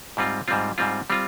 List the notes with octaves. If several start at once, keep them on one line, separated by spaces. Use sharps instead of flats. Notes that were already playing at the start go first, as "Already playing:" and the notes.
G#2 G3 C4 F4
G#2 G3 C4 F4
G#2 G3 C4 F4
G3 C4 F4